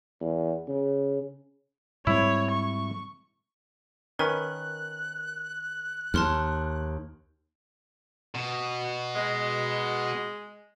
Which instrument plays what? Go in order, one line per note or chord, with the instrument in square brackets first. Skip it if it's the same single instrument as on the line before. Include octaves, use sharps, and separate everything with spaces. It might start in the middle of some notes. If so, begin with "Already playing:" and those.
[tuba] E2
C#3
[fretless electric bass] G#2 G3 C4 [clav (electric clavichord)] E4 [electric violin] C#5
[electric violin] C#6
[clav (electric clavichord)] D#3 C#4 B4 [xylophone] A#4 [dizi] F#6
[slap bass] D#2 [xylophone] A5 C6 F6
[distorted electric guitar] B2
[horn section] G#3